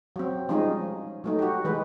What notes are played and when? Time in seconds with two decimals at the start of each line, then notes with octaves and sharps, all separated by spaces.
0.16 F#3 C4
0.49 F3 G3 G#3 C#4 D#4 G#4
1.24 F#3 A3 D#4
1.39 F#4 G4
1.65 E3 G#3 B4